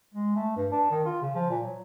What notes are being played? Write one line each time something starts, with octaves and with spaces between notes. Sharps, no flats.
G#3
A3
G2
D4
D#3
F4
C#3
F3
A#2
F#3